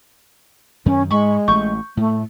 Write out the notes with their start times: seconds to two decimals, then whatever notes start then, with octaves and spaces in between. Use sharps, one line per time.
0.86 F#2 D#3 C#4
1.11 G#2 G#3 B5 C#6
1.48 A1 A3 C#6 G6
1.97 A2 A3